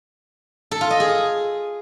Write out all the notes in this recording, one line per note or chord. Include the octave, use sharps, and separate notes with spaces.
A4
F4
D#5
G#4